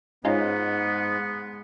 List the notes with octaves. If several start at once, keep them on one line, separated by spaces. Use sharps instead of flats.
G#2 G#3 B3 C#4 D#4 F4